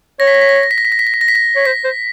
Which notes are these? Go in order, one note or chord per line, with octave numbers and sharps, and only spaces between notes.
C#5 A#6
B6
A#6
B6
A#6
B6
A#6
B6
A#6
B6
A#6
B6
A#6
B6
A#6
B6
A#6
C#5
C5 B6
C5